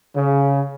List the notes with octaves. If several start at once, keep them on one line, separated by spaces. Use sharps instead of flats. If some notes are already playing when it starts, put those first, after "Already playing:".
C#3